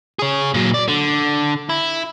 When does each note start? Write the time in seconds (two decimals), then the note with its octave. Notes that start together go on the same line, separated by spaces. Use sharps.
0.19 G#4 C#5
0.54 A#2 F#3
0.74 D5
0.88 D3
1.69 E4